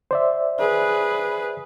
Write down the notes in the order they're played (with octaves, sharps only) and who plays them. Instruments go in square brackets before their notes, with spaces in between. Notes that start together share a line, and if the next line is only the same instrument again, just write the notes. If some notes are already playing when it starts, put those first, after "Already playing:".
[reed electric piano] C5 D5 E5
[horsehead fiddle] G#4 B4